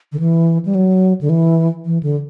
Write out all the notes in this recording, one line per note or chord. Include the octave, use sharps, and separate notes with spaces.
D3
E3
G3
F#3
D3
E3
E3
D3